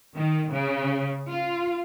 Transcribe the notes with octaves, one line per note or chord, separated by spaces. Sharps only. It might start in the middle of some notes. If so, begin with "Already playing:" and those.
D#3
C#3
F4